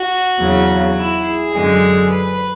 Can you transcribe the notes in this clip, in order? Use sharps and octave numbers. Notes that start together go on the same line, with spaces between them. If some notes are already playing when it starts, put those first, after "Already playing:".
Already playing: F#4
E2 C#3 F#3
E4
G#4
F#2 D3 G#3
B4